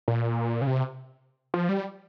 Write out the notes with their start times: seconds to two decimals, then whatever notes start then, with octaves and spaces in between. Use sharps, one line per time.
0.08 A#2
0.61 C#3
0.67 C3
1.54 F3
1.69 G3